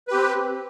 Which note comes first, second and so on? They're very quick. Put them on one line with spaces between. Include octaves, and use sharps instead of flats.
B4 G4 C4